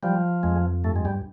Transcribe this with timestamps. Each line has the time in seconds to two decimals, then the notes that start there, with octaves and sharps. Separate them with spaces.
0.03 F3 G3
0.43 F2 G#3
0.84 G2 A3
0.96 G#3
1.05 G3